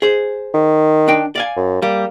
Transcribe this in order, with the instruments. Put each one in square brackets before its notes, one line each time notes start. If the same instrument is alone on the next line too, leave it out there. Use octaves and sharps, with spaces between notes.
[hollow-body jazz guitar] G#4 C5
[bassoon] D#3
[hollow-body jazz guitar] D4 G5
D5 F5 G#5
[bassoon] F#2
[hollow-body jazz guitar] G3 [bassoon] A#3